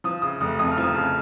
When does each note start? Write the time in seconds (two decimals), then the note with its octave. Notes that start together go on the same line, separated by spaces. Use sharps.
0.04 F3 D#6
0.22 C#3 D#6
0.40 F1 D#6
0.59 F2 D#6
0.71 F6
0.77 F3
0.84 D#6
0.95 C#3 F6